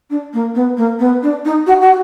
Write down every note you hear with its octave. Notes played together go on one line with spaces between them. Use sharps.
D4
A#3
B3
A#3
B3
D4
D#4
F#4
F#4